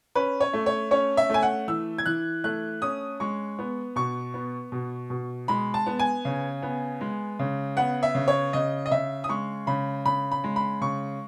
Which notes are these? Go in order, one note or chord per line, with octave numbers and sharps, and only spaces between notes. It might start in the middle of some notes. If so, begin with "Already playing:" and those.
C#4 B4
C#5
A3
C#5
C#4 C#5
E5
A3 G#5
F#5
E3 E6
G#6
E3 F#6
A3 F#6
C#4 D#6
G#3 C#6
B3
B2 C#6
B3
B2
B2
G#3 B5
A5
B3
G#5
C#3
B3
G#3
C#3
B3 F#5
E5
C#3
C#5
C#3 D#5
D#5
C#3 E5
D#6
G#3 C#6
C#3 B5
C#3 B5
B5
G#3
B5
C#3 C#6